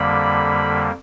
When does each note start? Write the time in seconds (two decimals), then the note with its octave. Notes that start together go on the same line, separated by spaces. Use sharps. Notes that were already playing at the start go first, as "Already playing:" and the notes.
Already playing: F2 D3 G3 A#3 B5